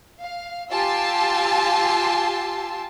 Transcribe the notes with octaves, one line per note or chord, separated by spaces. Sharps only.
F5
F4 G4 G#5 A5 C6 E6